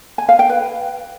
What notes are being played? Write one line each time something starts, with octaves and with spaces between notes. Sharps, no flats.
G#5
F5
G5
B4